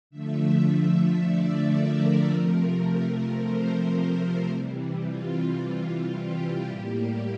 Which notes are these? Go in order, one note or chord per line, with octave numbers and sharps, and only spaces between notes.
D3 F3 A3 E5
D5
A#4
C3 F3 A3
A#4
C5
A#4
C3 E3 G3
F4
F4
G4
A2 G3 A#3